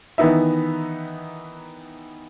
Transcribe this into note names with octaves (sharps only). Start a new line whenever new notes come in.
D#3 E3 B3 D#4 E5